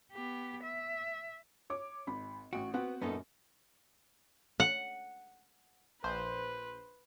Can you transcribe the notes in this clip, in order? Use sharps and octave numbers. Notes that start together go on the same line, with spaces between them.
B3 G4
E5
C#5 D6
G#1 B5
A1 F#4 D7
B3 C4 F#4 F#5
F#2 A#2 A#3 B3 D#4 A4
F#5
A#1 B4 C5